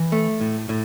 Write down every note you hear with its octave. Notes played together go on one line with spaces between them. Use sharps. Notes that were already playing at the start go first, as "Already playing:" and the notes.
Already playing: E3
A3
A2
A2